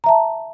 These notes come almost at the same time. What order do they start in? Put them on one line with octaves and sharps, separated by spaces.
A#5 E5 A5